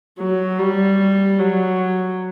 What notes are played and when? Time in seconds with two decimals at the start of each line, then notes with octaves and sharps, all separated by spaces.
0.19 F#3
0.59 G3
1.39 F#3